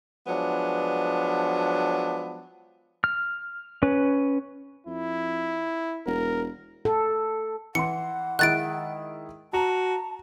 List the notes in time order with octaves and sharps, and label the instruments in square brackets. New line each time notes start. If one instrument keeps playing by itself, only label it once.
[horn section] F3 F#3 G#3 B3 D4
[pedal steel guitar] F6
C#4 B4
[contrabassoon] F2 [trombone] E4
[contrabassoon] E1 [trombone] A#4
[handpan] A4
[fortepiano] E3 C6 [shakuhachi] F#5 [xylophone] C#7
[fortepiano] D#3 G#3 E4 [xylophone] F#6 A6 D7
[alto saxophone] F#4 [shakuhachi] A5 [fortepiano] A#5